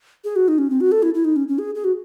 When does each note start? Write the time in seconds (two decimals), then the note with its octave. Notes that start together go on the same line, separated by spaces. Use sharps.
0.24 G#4
0.36 F#4
0.48 D#4
0.58 C#4
0.70 C4
0.81 F#4
0.92 A4
1.03 E4
1.14 E4
1.25 D#4
1.36 C#4
1.48 C#4
1.59 G#4
1.75 G#4
1.84 F#4